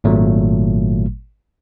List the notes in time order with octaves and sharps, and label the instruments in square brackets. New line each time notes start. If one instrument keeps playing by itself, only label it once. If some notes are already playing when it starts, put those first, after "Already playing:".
[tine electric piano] G#1 A#2 F#3 A3